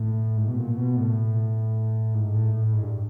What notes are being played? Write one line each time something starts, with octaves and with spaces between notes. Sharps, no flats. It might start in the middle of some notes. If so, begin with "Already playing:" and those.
Already playing: A2
G#2
B2
A#2
B2
A2
G#2
A2
A2
G#2
G2